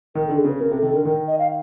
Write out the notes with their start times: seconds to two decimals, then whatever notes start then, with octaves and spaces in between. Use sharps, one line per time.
0.15 D#3 A#4
0.26 A4
0.29 D3
0.38 G#4
0.44 C#3 B4
0.60 C#3 A#4
0.71 C3 A4
0.82 D#3 A4
0.93 D3 A#4
1.05 D#3 A#4
1.28 D#5
1.39 F5